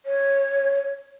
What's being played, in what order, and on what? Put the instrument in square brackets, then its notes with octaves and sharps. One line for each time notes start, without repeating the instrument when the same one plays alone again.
[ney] C#5